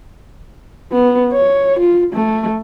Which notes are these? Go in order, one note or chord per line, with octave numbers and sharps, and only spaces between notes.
B3
C#5
F4
A3